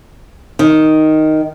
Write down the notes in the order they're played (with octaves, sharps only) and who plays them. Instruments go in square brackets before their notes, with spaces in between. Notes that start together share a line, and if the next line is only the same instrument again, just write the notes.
[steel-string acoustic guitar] D#3